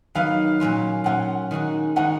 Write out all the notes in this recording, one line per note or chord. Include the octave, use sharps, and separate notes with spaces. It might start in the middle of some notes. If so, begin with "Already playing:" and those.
D#3 F#3 B3 D#4 F5
A#2 F#3 C#4 F4
A#2 F#3 C#4 F4 F#5
D#3 G#3 D#4 F#4
D#3 G#3 D#4 F#4 F#5